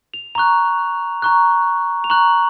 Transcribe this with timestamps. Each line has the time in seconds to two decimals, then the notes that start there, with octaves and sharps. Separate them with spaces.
0.14 F7
0.35 A#5 C#6 F#6 F7
1.22 A#5 C#6 F#6
2.04 F7
2.10 A#5 C#6 F#6 F#7